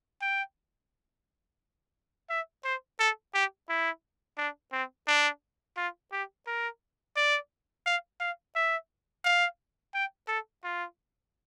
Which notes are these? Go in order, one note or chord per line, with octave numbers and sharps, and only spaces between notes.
G5
E5
C5
A4
G4
E4
D4
C4
D4
F4
G4
A#4
D5
F5
F5
E5
F5
G5
A4
F4